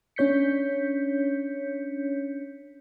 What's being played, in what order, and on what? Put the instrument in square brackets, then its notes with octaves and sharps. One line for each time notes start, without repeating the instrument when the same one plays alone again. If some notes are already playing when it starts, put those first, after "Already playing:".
[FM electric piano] C#4 D4 C#5 G6 B6 C#7